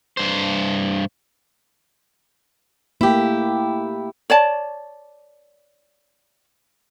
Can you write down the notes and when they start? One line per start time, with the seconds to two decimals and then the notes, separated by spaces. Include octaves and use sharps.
0.17 G2 C5
3.01 A3 A#3 E4 G4
4.30 C#5 D5 A5